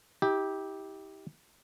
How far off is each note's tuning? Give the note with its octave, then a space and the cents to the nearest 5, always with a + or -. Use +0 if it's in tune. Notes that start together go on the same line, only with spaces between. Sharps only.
E4 -45 G4 +0